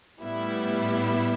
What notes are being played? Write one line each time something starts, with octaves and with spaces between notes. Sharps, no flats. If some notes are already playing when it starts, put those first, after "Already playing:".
A2 G3 B3 E4